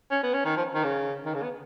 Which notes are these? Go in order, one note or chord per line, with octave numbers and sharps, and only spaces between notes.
C#4
B3
C#4
D#3
F3
D#3
C#3
D#3
C#3
B3